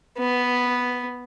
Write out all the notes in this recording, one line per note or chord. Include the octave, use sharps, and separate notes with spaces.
B3